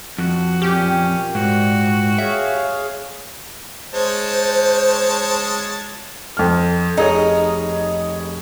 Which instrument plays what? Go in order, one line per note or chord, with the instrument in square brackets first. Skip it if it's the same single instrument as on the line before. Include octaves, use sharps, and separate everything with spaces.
[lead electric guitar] F2 [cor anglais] F#4
[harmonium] A#2 [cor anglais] C#4 [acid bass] G4
[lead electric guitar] G#2 [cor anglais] F#4
[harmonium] G#4 C#5 F5 [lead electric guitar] E5
[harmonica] G#3 C#5 A5 [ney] C5
[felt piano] F2 A4 F6
[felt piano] F1 G#4 C#5 [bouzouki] D#4